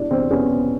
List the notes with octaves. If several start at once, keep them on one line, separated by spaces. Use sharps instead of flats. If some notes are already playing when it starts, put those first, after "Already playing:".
Already playing: B2 G#3 D4 E4
E2 C4 D4
B3 C#4